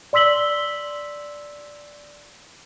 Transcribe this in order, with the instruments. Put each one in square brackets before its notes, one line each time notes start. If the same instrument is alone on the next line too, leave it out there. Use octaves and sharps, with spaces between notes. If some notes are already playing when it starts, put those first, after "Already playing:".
[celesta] D5 C6 E6 B6 F#7 G7